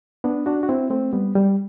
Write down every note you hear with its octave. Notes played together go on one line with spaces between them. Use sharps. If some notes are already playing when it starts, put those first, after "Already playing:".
B3 D4
D4 F#4
F#4
C4 E4
A3 C4
G3 B3
G3